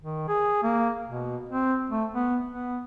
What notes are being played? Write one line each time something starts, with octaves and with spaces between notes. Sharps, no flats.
D#3
G#4
A#3
B2
C4
A3
B3
B3